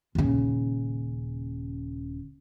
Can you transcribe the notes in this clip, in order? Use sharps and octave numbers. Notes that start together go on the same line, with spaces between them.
D#1 C#3